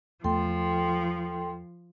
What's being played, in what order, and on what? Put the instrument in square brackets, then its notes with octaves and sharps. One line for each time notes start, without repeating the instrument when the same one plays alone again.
[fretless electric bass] E2 A3 [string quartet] F3 [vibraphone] A4 G5 C6